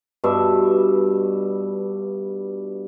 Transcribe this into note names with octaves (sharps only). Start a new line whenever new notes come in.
G2 B2 E5